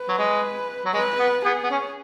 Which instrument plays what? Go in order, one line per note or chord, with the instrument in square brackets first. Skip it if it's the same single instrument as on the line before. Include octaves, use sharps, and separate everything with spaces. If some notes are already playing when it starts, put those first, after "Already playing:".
Already playing: [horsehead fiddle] B4
[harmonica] F#3
G#3
F#3
[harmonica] G#3 [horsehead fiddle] B4
[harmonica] B3
[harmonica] B3 [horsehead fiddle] G#4
[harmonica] B3
C#4